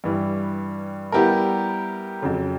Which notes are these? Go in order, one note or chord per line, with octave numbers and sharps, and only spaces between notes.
G2 E3 G3
G3 B3 E4 G4 A#4
F2 C#3 F#3